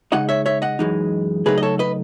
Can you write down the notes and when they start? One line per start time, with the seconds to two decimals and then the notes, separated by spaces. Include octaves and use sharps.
0.12 C#3 G#3 D#4 D#5 F#5
0.29 C#5 E5
0.46 C#5 E5
0.62 D#5 F#5
0.79 F#2 E3 G#3 D#4
1.46 C#3 F#3 A3 D#4 G#4 B4
1.58 D#5
1.62 A4 C#5
1.79 B4 D#5